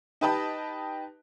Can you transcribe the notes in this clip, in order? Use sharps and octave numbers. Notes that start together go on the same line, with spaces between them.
D#4 G4 B4 D#5 G5 A5